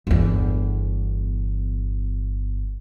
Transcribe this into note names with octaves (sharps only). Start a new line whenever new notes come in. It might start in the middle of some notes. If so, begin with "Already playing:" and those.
G1 E2